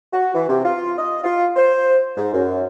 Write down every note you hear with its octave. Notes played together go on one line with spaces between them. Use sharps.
F#4
E3
C3
F4
D#5
F4
C5
G#2
F#2